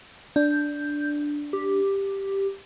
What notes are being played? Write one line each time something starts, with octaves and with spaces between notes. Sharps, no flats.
D4 G6
G4